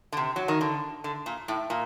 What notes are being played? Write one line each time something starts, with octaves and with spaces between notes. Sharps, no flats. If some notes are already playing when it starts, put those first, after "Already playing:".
D3
C3
F#3
D#3
D3
D3
A#2
A2
A#2